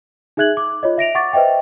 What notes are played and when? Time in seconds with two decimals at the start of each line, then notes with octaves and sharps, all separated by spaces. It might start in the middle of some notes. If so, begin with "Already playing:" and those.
0.37 D#4 G#4 E5 F#6 G#6 F#7
0.57 D6
0.83 F4 C#5 D#5
0.98 E5 A#6 D7 F7
1.15 F#5 C#6 D6 A6
1.33 B4 C5 D#5 E5 G5